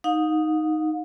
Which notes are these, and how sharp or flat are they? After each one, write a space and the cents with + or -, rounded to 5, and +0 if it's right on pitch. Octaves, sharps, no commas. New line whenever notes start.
D#4 +0 F5 +45